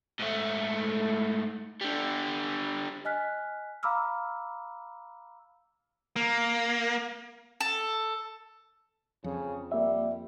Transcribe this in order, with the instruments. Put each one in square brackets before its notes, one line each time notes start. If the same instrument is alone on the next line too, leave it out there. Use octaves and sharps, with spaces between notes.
[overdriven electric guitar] G#2 A3
D3 G3
[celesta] D#5 G#5 F6 F#6 B6
F5 A#5 B5 D6 E6 F6
[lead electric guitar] A#3
[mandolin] A4
[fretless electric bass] F2 [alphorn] C#3
[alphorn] G3 [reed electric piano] A#3 E5